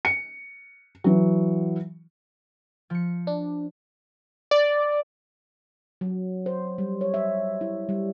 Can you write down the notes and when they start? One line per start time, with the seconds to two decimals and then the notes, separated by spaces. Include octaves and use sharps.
0.05 C#7
1.04 E3 F#3
2.90 F3 C#7
3.27 D4
4.51 D5
6.01 F#3
6.46 C5
6.78 G3
7.01 C#5
7.14 E5
7.61 E4
7.89 G3